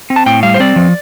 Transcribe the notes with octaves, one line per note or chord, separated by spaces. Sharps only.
C4
A5
A2 G5
G3 F5
C5
C4 D5
F3